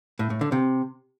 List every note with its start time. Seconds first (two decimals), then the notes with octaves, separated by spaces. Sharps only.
0.19 A2
0.30 A2
0.41 D3
0.52 C3